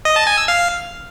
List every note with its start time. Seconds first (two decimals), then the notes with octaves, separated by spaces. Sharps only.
0.05 D#5
0.16 A5
0.27 G#5
0.37 E6
0.48 F5